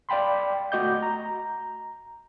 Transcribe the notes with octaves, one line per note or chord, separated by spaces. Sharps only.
D5 F5 G5 B5 C6
A3 F#4 D#5 D6 G6
A#5